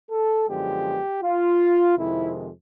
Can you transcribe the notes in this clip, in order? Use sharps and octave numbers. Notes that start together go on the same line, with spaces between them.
A4
F#2 D3 F3 G#3 B3 G4
F4
F2 C3 D#3 G#3 E4